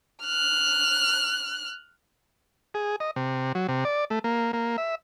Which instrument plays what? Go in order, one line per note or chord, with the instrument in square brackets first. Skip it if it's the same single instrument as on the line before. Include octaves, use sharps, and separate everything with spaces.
[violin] F6 F#6
[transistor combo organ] G#4
D#5
C3
F#3
C3
D5
A3
A#3
A#3
E5